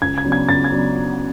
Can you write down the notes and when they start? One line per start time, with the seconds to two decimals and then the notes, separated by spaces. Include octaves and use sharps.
0.02 C#2 G#6
0.18 G#6
0.24 C#3 F#3 B3 D4
0.32 G#6
0.49 C#2 A6
0.64 G#6
0.72 C#3 F#3 B3 D4